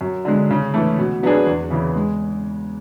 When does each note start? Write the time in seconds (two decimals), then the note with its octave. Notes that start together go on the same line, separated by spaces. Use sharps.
0.01 F#2
0.25 D3 G#3
0.50 C#3
0.74 E3 A3
0.99 B2
1.23 F#3 B3 D4 G#4
1.47 E2
1.70 C#3 E3 B3
1.96 G#3